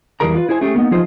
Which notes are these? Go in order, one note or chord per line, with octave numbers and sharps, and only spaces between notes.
E2 E3 G3 G#4 A#4 A#5
F4 B4
E4 G#4 C5 G#5
A3 C#4 G4 G#4
A#3 B3 D#4
F3 D#4 F4 G#4 C5